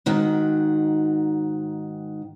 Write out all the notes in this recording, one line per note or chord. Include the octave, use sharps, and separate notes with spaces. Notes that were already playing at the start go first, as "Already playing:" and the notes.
G#2 D#3 F#4